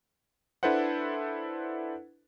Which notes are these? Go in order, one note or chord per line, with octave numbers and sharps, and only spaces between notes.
D4 E4 A4 B4 C5 F#5